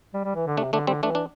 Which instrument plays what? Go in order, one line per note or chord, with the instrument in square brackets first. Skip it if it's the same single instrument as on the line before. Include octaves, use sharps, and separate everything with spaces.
[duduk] G3
G3
E3
D3
[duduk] C3 [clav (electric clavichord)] A3 D4
[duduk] D3 [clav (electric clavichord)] A3 D4
[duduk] D3 [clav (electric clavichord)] G3 C4
[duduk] E3 [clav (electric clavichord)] A3 D4
[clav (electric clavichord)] D4